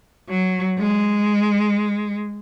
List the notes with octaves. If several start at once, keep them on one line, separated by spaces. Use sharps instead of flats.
F#3
G#3